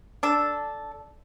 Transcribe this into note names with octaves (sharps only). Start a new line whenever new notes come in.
D4 A4